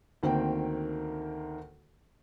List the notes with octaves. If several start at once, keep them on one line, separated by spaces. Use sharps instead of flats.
D2 D#3 A#3 C4 G5